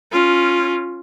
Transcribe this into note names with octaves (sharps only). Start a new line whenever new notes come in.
C#4 F4